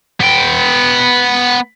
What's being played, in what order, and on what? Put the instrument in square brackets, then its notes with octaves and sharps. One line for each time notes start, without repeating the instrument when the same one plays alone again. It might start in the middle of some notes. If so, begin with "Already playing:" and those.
[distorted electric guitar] B3 G5